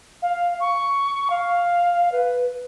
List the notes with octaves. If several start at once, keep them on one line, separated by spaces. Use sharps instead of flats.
F5
C#6
F5
B4